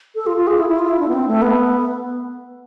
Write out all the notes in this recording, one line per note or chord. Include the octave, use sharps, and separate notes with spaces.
A4
F4
F4
G#4
E4
E4
F4
E4
D4
B3
C4
A3
B3